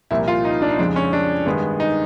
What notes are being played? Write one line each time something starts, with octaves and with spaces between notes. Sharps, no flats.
C2 A#2 F3 A#3 E4
F4
D#4
D4
D#4
F1 F2 C#3 F3 G#3 D4
C#4
D4
G2 D#3 G#3 B3
D#4